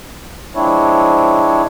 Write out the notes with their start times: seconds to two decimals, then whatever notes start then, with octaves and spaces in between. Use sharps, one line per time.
0.55 F3 G#3 C4 D4 E4 C#5